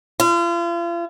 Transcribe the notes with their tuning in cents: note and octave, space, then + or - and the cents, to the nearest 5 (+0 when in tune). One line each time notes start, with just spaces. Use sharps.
F4 -40